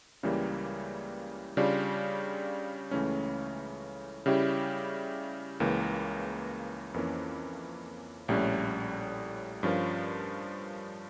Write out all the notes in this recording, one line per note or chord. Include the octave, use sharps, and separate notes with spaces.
C#2 C#3 E3 G3 A#3
C#3 G3 D4 F4
C#2 C#3 E3 A3 C#4
C#3 G3 C#4 E4 G4
C#2 C#3 E3 A#3
F2 E3 A#3 C#4
A#1 A2 G3 C#4
G2 F3 C#4 F4 A#4